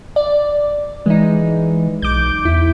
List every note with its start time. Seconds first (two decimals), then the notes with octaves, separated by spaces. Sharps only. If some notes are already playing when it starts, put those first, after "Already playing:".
0.16 D5
1.06 E3 G#3 D#4
2.02 B1 D6 G6
2.45 E2 E4